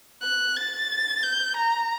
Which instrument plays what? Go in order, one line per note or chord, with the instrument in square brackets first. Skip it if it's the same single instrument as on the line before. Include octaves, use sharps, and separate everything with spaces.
[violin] F#6
A6
G6
A#5